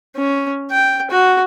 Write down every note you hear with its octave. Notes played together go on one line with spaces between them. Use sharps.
C#4
G5
F#4